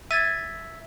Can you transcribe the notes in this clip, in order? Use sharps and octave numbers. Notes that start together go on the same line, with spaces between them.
E5 G#6 A6 D#7